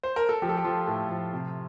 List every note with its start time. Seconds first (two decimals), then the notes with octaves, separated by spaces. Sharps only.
0.03 C5
0.16 A#4
0.29 A4
0.42 F3 G4
0.49 A4
0.57 G4
0.65 F3 F4
0.88 A2
1.09 F3
1.33 C3